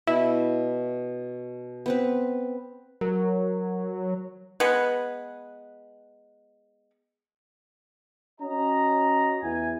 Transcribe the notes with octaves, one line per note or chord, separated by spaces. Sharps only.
B2 E4
B3 C4 B4
F#3 A#4
G#3 B3 G#4 B4
C#4 F#4 D#5 A#5
E2 E3 G#5